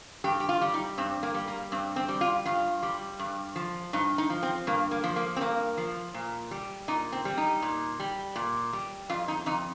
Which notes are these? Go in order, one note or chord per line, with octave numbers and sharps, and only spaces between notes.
G2 G4
G4
F4
G3
D#4
G2 C4
A#3
G3
A#3
G2 C4
C4
G3
F4
G2 F4
G3
G2
F3
G2 D#4
D#4
F3
C4
G2 A#3
A#3
F3
A#3
C4
G2 A#3
F3
A#2
G3
A#2 D#4
C4
G3
D#4
A#2
G3
A#2
G3
F2 F4
D#4
F2 D#4